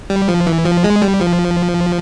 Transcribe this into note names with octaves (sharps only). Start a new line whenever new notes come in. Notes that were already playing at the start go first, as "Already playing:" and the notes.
G3
F3
E3
F3
G#3
G3
F3